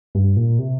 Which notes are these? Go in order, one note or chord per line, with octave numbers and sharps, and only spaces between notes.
G2
A#2
C3